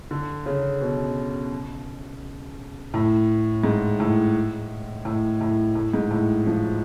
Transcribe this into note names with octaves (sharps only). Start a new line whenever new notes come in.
D3
C#3
B2
A2
G#2
A2
A2
A2
A2
G#2
A2
F3